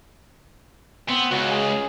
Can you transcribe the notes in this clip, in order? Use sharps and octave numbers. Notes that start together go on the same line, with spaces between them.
B3 C4
C#2 F#4
G#4